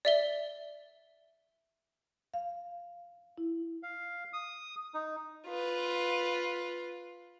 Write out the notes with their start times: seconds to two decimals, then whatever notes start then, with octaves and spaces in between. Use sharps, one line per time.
0.05 D5 E5 G7
2.34 F5
3.38 E4
3.83 F5
4.33 D#6
4.94 D#4
5.46 F4 B4